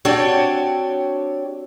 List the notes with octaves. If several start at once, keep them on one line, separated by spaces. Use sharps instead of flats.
C4 D4 F#4 G4 C#5 D5